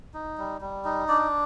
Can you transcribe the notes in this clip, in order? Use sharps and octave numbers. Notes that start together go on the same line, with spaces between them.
D#4
G3
G3
D#4
D4 D5